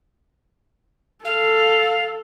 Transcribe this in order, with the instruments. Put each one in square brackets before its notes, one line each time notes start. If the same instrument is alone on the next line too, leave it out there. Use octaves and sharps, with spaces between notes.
[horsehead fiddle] A4 [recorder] F5